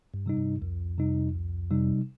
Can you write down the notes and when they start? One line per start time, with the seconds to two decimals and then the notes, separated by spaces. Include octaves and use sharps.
0.14 G2
0.26 C3 G3 D#4
0.37 G2
0.61 C2 F2
0.98 C3 G3 D#4
1.35 C2
1.71 C3 G3 D#4